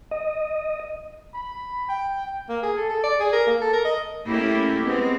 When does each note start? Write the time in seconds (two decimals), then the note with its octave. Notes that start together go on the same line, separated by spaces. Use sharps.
0.11 D#5
1.34 B5
1.89 G5
2.49 A#3
2.63 G#4
2.77 A4
2.89 A4
3.04 D5
3.20 G#4
3.33 A#4
3.47 A#3
3.61 A4
3.73 A#4
3.85 D#5
4.27 A3 A#3 C#4 E4 G4
4.82 G#3 B3 C4